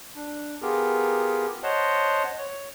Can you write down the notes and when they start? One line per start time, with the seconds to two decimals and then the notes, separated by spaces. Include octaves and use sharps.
0.15 D4
0.62 B3 F4 G4 G#4 A#4
1.63 C5 C#5 D#5 F#5 A5 C6
2.38 C#5